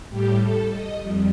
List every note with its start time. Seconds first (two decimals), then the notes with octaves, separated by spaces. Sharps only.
0.10 A2 G3 G4
0.41 A4
0.71 D#5
1.02 F2 G3